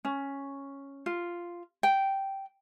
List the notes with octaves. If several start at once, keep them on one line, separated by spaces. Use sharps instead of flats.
C#4
F4
G5